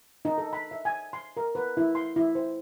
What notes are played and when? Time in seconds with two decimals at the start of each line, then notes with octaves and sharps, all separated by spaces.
0.25 D#4
0.38 A4
0.53 B5
0.71 E5
0.85 G#5
1.13 C6
1.37 A#4
1.55 B4
1.77 E4
1.95 C6
2.16 E4
2.35 C5